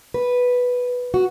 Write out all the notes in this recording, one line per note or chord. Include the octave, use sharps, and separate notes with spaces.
B4
F#4